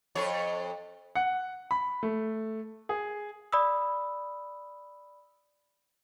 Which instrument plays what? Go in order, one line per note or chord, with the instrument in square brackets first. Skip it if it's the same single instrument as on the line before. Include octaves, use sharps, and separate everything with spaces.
[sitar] F2 C#5
[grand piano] F#5
B5
A3
G#4
[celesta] D5 B5 D#6 E6